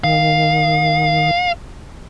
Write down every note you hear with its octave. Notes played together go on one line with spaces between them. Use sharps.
D#3 F5